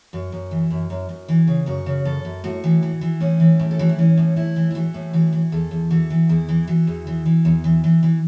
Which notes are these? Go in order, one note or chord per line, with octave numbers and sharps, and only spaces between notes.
F#2 F#4
F#2
E3
F#2
F#2
F#2
E3
C#3
F#2 F#4
C#3
F#2 A4
F#2
A2 F#4
E3
E3
E3
A2 C#4
E3
A2
A4
E3 F#4
E4
E3 C#4
A2
A2 E4
E3
E4
E3 F#4
A2
E3 F#4
E3
E2 A4
E2
E3 F#4
E3
E2 E4
E3
E3 F#4
E2
E3
E3
E2
E3
E3
E3